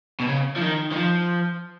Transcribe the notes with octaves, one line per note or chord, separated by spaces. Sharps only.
B2
C#3
F3
D#3
D#3
F3